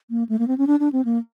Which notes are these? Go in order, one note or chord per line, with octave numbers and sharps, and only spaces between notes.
A#3
A3
A#3
C4
C#4
D4
D4
C4
A#3